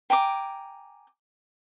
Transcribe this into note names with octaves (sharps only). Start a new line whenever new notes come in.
G5 G#5 A#5 D6